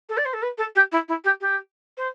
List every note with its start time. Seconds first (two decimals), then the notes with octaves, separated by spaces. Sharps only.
0.09 A4
0.17 D5
0.25 C5
0.33 A4
0.42 B4
0.58 A4
0.75 G4
0.92 E4
1.08 E4
1.24 G4
1.41 G4
1.97 C5